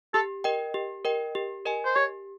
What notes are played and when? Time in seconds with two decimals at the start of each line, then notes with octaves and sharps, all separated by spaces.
0.14 G4 A4
0.44 A#4 D#5 G5
0.74 G4
1.05 A#4 D#5 G5
1.35 G4
1.66 A#4 D#5 G#5
1.85 C5
1.95 G4 C#5